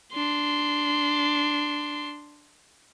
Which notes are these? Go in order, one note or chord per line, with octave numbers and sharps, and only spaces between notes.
D4 C6